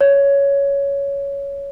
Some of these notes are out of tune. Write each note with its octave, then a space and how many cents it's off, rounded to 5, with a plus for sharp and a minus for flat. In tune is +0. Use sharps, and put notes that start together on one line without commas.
C#5 +10